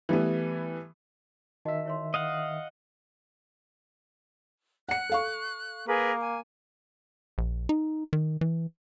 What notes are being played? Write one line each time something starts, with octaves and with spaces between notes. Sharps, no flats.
E3 G3 A3 B3
D#3 F#4 D#5 E5 A5
E4 C#5 C6
D#5 F5 F#5
F#5 F#6 C#7
A4 F5 C#6
A#3 G#4 A#4 B4
G#5
A#1
D#4
D#3
E3